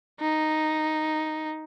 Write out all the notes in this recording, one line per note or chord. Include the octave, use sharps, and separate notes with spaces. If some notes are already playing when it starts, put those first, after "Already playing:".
D#4